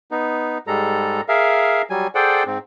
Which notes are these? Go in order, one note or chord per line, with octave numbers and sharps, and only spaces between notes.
B3 D#4
G#2 G3 G#3 A4 A#5
G#4 A#4 E5 F5
F#3 G3 G#5
G#4 A4 C5 D5 F#5 G5
G#2 C4